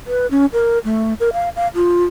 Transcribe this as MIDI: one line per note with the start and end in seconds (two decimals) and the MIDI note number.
0.07 0.27 71
0.31 0.46 61
0.53 0.79 70
0.85 1.14 57
1.20 1.33 70
1.33 1.49 77
1.56 1.68 77
1.75 2.05 65